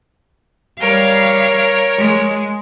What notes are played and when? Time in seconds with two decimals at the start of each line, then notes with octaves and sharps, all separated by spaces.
0.80 G3 A#4 C#5 F5
1.98 G#3